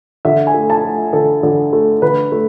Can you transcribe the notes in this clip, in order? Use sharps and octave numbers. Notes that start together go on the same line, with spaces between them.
D3 E5
G#5
A3
A5
A3
D3 A4
D3
A3
D3 B4
A3